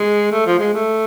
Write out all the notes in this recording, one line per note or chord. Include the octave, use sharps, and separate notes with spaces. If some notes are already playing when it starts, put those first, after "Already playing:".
Already playing: G#3
A3
F3
G#3
A3